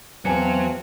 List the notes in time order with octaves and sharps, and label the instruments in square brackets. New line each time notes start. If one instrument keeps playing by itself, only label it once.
[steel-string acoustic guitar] E2 F5 [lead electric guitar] F#3 [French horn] C4 [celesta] G#5 A5 C#7